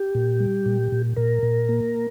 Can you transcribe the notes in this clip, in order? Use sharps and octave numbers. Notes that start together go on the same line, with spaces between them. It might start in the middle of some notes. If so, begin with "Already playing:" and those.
Already playing: G4
A#2
G3
A#2
A#2
A#2 A#4
A#2
A#3